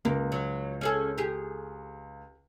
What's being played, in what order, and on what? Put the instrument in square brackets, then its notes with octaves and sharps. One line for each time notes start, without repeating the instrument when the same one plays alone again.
[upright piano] C#2 [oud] A#3
[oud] F#3
C#4 G#4 A4
G4 G#4